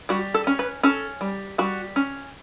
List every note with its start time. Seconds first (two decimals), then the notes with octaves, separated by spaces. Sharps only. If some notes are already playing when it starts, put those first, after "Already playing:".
0.09 G3 F#4
0.34 A4
0.47 C#4
0.59 B4
0.83 C#4 A4
1.21 G3
1.58 G3 F#4
1.96 C#4